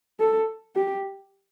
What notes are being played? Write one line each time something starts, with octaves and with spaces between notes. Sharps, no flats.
A4
G4